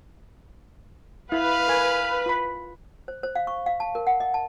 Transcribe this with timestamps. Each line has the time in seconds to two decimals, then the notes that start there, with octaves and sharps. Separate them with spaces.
1.32 E4 B4 F5
1.68 A#4 G#5
2.26 F4 B5
3.08 C5
3.23 C5
3.35 F5
3.47 C#6
3.66 F5
3.80 A5
3.95 A#4
4.07 F#5
4.20 D#5
4.34 A5